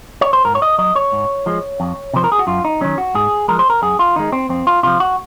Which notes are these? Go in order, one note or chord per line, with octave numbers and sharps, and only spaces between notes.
C#5
C5
G#2 A#4
C#5
D#5
F#3 D#5
C#5
G#2
F3 G#3
F2
C3 F3 C5
A#4
G#4
F#4
F#2 F4
D#4
D#3 F#3 C#4
F#4
G#2 G#4
F3 G#3 A#4
C5
A#4
F#2 G#4
F4
D#3 G#3 D#4
C4
F2 C4
F4
C3 F3 F4
F#4